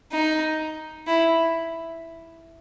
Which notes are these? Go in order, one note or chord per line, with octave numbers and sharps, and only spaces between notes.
D#4
E4